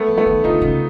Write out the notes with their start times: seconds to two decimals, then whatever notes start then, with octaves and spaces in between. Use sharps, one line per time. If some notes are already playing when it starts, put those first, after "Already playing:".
Already playing: A3 B3
0.08 F3
0.17 A3 B3
0.26 D#3
0.44 D3 D#4 F4
0.62 C#3